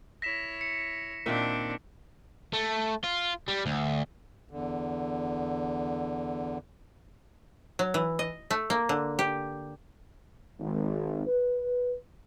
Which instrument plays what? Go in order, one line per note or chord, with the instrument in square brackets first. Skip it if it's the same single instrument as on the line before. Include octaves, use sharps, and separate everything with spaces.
[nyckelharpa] E4 C#5 [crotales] A#6 B6 E7
[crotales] C#7
[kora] A#2 D#3 E5 [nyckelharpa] C4 D4
[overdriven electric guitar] A3
F4
G3
D2
[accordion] E2 D3
[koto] F#3
E3
D#5
A3
A#3
D3
G4
[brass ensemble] G#1
B4